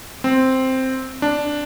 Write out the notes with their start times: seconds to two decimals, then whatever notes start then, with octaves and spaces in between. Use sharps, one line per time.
0.24 C4
1.22 D4